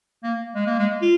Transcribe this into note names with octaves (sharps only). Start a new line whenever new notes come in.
A#3
G#3
A#3
G#3
F4